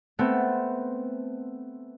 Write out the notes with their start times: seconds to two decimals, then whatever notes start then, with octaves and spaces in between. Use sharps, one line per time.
0.19 A3 B3 C4 A4